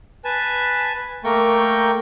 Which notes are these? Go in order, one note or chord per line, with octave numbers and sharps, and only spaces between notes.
B4 G#5 A5
A3 A#3 A#4 G5 C#6 G6